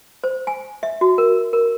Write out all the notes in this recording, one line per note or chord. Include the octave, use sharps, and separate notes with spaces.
C5
G#5
E5
F#4
A#4
A#4